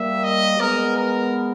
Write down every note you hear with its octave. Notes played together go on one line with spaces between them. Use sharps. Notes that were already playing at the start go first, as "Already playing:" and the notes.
Already playing: G3 A#3 E5
D#5
G#3 B3 A#4
A#4